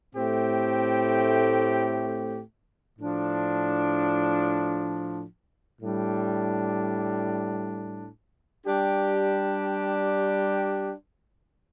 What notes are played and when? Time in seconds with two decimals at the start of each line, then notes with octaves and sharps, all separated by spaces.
0.14 A2 A3 C4 G4
2.98 A2 F3 D4
5.81 A2 G3 D4
8.66 G3 D4 G4